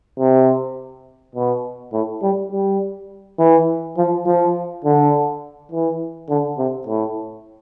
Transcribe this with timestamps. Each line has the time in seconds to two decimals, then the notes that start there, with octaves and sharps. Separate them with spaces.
0.19 C3
1.35 B2
1.93 A2
2.22 G3
2.52 G3
3.39 E3
3.97 F3
4.26 F3
4.84 D3
5.72 E3
6.29 D3
6.58 C3
6.87 A2